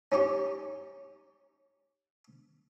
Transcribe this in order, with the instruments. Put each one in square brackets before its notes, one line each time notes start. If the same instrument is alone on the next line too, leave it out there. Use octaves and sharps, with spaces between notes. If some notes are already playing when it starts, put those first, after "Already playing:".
[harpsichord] C#4 D#4 G4 C#6